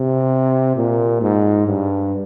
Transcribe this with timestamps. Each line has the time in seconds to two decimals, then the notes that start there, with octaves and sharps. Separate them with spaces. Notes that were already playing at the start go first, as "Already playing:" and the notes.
Already playing: C3
0.77 A#2
1.21 G#2
1.67 G2